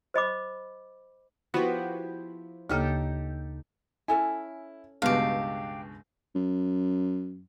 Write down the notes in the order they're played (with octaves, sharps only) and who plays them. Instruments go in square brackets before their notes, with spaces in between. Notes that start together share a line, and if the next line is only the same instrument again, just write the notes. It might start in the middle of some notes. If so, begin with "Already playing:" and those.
[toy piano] C5 D#5 B5 D6
[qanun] F3 E4 G4 [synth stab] B3 F#4
[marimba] D2 C#3 A#3 [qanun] D#4 G4 A4
[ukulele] C#4 A4 G#5 [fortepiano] E4
[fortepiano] C#2 G2 B2 [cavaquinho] G4 F5
[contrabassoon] F#2